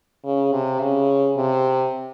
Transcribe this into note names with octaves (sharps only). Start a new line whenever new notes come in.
C#3
C3
C#3
C3